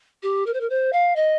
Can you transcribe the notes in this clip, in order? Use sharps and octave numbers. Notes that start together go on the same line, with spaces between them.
G4
A#4
C5
A#4
C5
F5
D#5